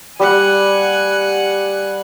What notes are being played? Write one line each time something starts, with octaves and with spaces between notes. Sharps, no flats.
G3 F#5 G#5